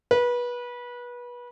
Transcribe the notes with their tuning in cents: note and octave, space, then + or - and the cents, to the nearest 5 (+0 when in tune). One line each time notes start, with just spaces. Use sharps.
B4 -25